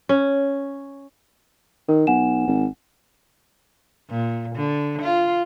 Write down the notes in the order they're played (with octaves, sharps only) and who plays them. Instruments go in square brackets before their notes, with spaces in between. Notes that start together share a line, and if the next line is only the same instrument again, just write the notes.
[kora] C#4
[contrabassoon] D#3 [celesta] A#4
[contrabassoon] B1 [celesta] F#5 G#5 E7
[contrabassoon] G#1
[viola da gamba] A#2
D3
F4